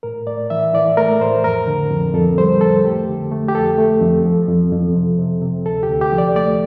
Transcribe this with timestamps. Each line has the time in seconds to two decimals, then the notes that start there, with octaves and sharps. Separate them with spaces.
0.03 A2 A#4
0.26 A2 D5
0.50 E3 E5
0.74 E3 D5
0.97 A3 A#4
1.21 A2 C5
1.44 F2 A#4
1.67 D3
1.91 F2
2.14 F2 A4
2.38 G3 C5
2.61 F2 A4
2.85 A3 G4
3.09 D3
3.32 A3
3.48 G4
3.55 F2 A4
3.78 A3
4.02 F2
4.26 F3
4.48 F2
4.72 F2
4.96 C3
5.19 C3
5.42 C3
5.66 D2 A4
5.83 G4
5.90 D2
6.01 G4
6.12 F3
6.18 D5
6.36 A3 D5